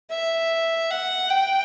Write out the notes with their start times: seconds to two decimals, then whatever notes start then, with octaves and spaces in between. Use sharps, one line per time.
0.11 E5
0.91 F#5
1.30 G5